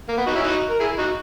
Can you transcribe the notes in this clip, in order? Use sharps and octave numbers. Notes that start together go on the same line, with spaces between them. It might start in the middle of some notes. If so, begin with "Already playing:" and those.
A#3
B3
D#4 F#4
C#4 E4
D#4 F#4
A#4
E4 G#4
D#4 F#4